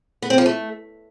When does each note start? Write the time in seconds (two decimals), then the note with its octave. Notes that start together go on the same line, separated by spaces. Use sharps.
0.22 B3
0.30 C4
0.38 F3
0.46 A3